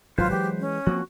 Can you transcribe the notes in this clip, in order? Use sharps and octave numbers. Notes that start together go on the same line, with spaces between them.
G#1 G2 F#3 F4 B4 C5
E3 G#3 G4
C#4
F3 A#3 C4 F#4